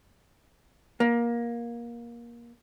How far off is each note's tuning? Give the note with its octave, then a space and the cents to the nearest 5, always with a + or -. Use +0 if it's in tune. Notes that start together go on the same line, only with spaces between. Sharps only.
A#3 +20